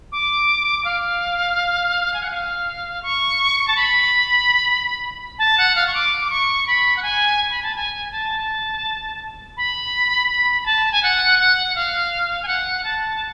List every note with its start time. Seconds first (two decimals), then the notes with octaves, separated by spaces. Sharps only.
0.12 D6
0.85 F5
2.14 G#5
2.22 F#5
2.30 F5
3.03 C#6
3.68 A5
3.76 B5
5.39 A5
5.58 F#5
5.75 F5
5.87 C#6
5.94 D6
6.25 D6
6.30 C#6
6.67 B5
6.97 F#5
7.02 G#5
7.51 B5
7.63 A5
7.75 G#5
8.12 A5
9.57 B5
10.30 B5
10.62 B5
10.66 A5
10.92 G#5
11.03 F#5
11.39 F#5
11.75 F5
12.43 G#5
12.48 F#5
12.84 A5